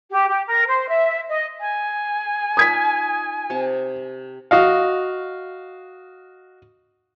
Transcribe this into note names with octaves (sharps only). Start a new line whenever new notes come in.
G4
G4
A#4
C5
E5
D#5
G#5
D#4 F4 D#6 G#6 B6
C3 A5
F#4 D#5 F5